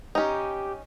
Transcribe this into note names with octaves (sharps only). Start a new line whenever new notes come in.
C#4 D#4 G4